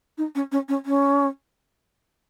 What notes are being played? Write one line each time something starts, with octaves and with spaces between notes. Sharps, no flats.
D#4
C#4
C#4
C#4
C#4